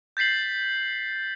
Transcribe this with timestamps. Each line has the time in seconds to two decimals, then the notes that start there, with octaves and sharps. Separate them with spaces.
0.17 G6 A6 B6 C7 F#7